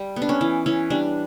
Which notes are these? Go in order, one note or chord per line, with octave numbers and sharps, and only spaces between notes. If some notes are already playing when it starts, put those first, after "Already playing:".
Already playing: G3
B3
D4
C#4
E3
E3 C#4
G3 D4